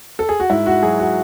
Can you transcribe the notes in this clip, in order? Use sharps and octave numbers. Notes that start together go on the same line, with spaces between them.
A4
G#4
F#4
G#2 E4
F#4
F#3 G#4
F#4